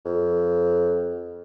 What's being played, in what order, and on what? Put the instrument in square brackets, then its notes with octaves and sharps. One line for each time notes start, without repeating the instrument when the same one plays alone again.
[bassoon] F2